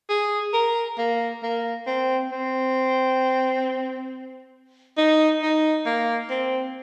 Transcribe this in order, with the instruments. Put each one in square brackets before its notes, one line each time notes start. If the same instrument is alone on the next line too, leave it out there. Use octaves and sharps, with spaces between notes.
[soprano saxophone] G#4
A#4
A#3
A#3
C4
C4
D#4
D#4
A#3
C4